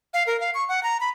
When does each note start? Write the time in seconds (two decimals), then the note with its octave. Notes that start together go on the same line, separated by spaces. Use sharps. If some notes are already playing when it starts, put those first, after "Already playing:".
0.14 F5
0.27 A#4
0.40 F5
0.54 C#6
0.69 F#5
0.83 A#5
1.00 B5